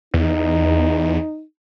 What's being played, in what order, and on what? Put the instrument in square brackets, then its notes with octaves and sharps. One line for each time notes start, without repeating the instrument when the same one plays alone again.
[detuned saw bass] E2 [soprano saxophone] D#4